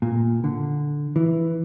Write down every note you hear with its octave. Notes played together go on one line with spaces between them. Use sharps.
A#2
D3
E3